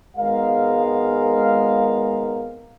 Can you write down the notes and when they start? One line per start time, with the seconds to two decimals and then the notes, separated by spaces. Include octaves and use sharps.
0.17 G#1 G#3 B3 A#4 F5